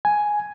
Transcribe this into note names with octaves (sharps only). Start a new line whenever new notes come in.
G#5